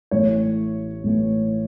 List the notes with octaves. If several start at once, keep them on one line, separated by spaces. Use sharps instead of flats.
A1 A2 E3 C#5
A1 A2 E3